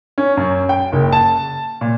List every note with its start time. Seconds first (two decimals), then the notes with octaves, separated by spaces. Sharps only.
0.18 C#4
0.37 F#2
0.69 G5
0.92 F#1
1.12 A5
1.81 A#2